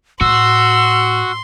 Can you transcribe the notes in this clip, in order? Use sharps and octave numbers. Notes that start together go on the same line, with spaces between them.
A2 F#4 C6 E6